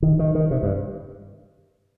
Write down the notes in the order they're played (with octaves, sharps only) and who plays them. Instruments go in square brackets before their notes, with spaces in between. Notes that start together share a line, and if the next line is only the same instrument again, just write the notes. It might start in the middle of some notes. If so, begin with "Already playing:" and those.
[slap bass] D#3
D#3
D#3
C3
G2